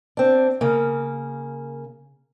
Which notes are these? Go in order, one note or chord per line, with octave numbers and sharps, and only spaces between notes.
C4 D4
C#3 A#3